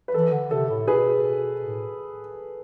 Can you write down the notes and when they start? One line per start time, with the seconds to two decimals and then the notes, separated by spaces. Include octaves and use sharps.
0.08 B4
0.14 E3 A4
0.32 D3
0.51 C3 A4
0.69 A2
0.87 B2 G#4 B4
1.61 A2